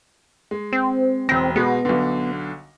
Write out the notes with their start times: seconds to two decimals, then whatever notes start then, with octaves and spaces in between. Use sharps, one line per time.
0.51 G#3
0.73 C4
1.29 E1 C4 A#6
1.56 B2 G#3 B3
1.85 B1 D3